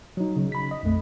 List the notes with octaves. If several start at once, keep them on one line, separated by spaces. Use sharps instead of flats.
F#3 D#4
C#3
B5 B6
D#5
A#1 F2 A3